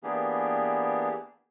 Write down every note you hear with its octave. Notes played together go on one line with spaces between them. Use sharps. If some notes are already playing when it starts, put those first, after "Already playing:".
E3 A#3 B3 D4 G4 G#4